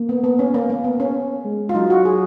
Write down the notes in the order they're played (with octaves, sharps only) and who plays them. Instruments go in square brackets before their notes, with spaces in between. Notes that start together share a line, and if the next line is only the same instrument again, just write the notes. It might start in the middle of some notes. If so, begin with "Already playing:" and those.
Already playing: [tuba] A#3
[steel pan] B3
B3
C#4
[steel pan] A#3 [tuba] B3
[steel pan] A#3
B3
C#4
[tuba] G#3
[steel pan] F4
[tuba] F#3 [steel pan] D#4
[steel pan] F#4
G#4